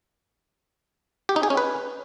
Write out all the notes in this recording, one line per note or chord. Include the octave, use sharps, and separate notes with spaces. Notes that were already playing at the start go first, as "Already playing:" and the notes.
G4
D#4
G#4
C#4
B4